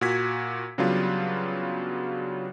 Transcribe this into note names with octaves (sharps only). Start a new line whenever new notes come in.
A#2 F#4 G#6 B6
C#3 F#3 G3 B3 D4 F4